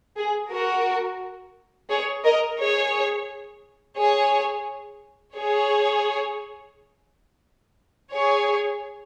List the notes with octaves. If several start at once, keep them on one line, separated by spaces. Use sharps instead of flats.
G#4
F#4 A#4
G#4 C#5
A#4 D#5
G#4 C#5
G#4 C#5
G#4 C#5
G#4 C#5